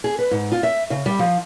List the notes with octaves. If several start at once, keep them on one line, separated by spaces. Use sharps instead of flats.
G#4
B4
G#2
F4
E5
C#3
G3
F3